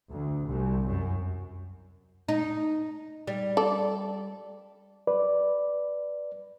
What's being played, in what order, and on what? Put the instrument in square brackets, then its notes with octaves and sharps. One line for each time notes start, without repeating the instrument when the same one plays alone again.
[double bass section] D2
C2
F#2
[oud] D#4
G3
[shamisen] A4 D5
[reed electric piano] B4 D5